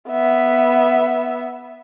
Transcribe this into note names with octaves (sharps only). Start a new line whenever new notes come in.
B3 E5